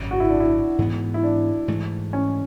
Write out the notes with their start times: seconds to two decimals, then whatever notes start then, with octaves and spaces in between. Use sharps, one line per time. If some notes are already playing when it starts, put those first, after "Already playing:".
Already playing: G#1 F#2 C#3
0.11 F#4
0.20 E4
0.30 D4
0.40 E4
0.78 G#2 E3 B3
1.14 E4
1.23 D4
1.68 G#2 E3 A3
2.13 C#4